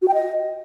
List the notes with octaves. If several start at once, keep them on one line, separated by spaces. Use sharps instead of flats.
F#4
G5
D#5